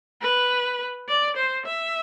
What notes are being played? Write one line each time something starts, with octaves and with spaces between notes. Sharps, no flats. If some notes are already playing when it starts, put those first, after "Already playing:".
B4
D5
C5
E5